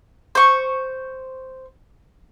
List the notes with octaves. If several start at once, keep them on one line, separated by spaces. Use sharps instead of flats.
C5 C#6